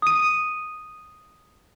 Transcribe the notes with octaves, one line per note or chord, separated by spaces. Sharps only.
D#6 D#7